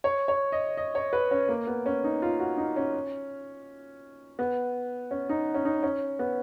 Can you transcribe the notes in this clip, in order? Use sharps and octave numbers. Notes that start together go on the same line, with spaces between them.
C#5
C#5
D#5
D#5
C#5
B4
C#4
A#3
B3
C#4
D#4
F4
F#4
D#4
C#4
B3
C#4
D#4
C#4
D#4
C#4
B3